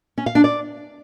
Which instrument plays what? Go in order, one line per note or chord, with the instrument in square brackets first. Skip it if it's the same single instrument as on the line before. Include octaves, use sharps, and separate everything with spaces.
[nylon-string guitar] C#4
F5
D4
D5